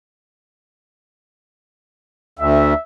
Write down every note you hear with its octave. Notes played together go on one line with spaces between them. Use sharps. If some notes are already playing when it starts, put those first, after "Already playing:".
D2 E5